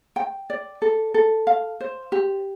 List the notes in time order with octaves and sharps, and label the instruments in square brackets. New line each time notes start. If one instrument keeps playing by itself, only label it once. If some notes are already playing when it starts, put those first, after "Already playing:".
[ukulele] G5
D5
A4
A4
F5
C5
G4